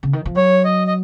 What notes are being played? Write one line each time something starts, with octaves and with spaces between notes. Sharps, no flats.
C#3
D#3
F3
F#3 C#5
D#5
D#5